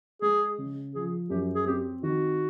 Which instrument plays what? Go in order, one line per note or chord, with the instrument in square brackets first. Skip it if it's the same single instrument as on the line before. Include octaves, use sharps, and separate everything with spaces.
[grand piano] G#3 [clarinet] G#4
[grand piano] C#3
[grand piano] F3 [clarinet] G#4
[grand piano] F#2 [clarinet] G4
[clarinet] G#4
[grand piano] C4 [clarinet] G4
[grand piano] D#3 [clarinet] F#4